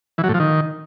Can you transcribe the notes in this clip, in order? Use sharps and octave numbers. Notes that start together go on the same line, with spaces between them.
E3
F#3
A2
F3
D#3